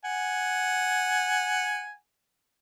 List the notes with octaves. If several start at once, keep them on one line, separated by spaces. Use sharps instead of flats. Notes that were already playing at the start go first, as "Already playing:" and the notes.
F#5 G#5